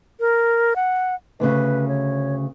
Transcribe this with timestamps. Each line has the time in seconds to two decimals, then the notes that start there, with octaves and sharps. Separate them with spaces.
0.20 A#4
0.76 F#5
1.40 D2 A#2 C#3 B4
1.88 C#5